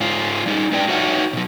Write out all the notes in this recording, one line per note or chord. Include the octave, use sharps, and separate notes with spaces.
G#2 F4
G3 D#4
G#3 D4 B4 D5 G5
D#4 F#4 B4 C#5 E5 F#5
B2 F#3